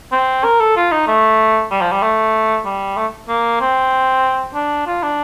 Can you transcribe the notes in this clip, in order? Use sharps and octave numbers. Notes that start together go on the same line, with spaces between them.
C4
A#4
A4
F4
D#4
A3
G3
F3
G3
A3
G3
A3
A#3
C4
D4
F4
D4